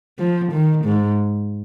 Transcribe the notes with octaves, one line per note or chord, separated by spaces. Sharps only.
F3
D#3
G#2